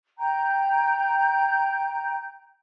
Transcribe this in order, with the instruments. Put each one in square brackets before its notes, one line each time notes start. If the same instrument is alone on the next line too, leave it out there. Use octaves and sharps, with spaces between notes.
[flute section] G5 A#5 G6